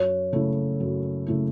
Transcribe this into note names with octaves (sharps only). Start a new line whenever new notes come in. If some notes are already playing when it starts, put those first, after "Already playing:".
Already playing: F#2 C#5
C#3 A3 E4
F#2
C#3 A3 E4